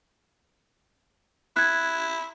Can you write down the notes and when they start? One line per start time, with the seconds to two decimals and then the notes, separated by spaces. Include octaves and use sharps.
1.56 E4 F#6 G#6